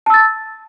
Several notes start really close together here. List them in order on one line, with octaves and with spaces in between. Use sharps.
A5 E6 A6